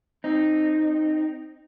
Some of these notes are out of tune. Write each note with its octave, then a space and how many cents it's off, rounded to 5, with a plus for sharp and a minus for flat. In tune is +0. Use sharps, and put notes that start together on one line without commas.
C4 +0 D#4 -10